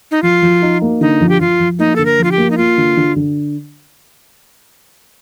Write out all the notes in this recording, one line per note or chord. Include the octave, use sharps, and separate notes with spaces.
D#4
F3 F4
F3
D#4
A#3
D3 D#4
F3
G4
F3 F4
F3
A#3 D#4
D3 A4
A#4
F3
F4
G4
A#3
D#4
A#3 F4
D3
D3
D3